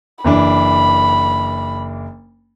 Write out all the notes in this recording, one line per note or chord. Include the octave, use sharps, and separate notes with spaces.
F#1 E3 D4 B5